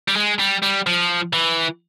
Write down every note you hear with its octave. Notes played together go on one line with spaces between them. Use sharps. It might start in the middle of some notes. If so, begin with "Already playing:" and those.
G3
G#3
G3
G3
F3
E3